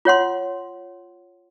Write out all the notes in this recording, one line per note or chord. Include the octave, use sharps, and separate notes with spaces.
F4 C#5 F#5 C6